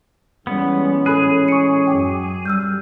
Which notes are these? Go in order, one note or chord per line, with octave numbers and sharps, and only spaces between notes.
E3 G3 G#3 B3 C#4
A2 G#4 A4 B5 F#6
C#6 C#7
F#2 F#3 G5 D6
G3 E6 F6 G6